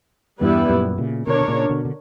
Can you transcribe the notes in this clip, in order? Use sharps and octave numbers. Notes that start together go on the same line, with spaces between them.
E2 G2 G3 B3 E4 B4
F#2 A#2
A#2 C#3
B2 D3 D4 A#4 C#5
D3
A#2 C#3
B2 D3
D3